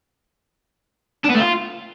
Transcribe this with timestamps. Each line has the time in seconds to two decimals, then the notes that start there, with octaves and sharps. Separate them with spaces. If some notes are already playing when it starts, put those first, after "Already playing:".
1.25 D4
1.30 B3
1.35 A3
1.40 F4